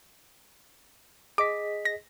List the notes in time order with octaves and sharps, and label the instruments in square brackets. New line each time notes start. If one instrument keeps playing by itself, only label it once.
[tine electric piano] G#4 D#5 B6 [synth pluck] D6
[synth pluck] A#6